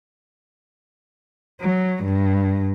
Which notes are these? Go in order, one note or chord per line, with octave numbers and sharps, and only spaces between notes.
F#3
G2